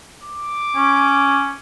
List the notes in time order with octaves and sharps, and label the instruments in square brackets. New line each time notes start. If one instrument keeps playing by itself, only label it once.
[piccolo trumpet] D6
[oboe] C#4